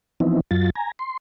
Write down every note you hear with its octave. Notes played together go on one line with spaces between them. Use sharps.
E3 F3 B3 C4 D#4 E4
F#2 F#3 F4 A6
G#5 A#5
C6